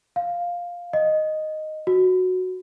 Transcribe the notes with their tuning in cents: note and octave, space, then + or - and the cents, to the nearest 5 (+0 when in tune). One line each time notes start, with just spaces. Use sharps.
F5 +5
D#5 -5
F#4 -5